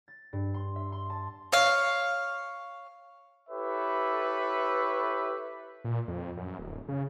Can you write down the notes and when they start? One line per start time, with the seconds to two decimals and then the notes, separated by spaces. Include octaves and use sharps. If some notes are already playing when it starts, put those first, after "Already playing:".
0.08 A6
0.33 G2
0.54 C6
0.76 E5
0.92 C6
1.10 A5
1.52 C#5 F5
3.49 E4 G4 A4 B4 C#5 E5
5.84 A#2
6.08 F2
6.37 F#2
6.59 D1
6.89 C#3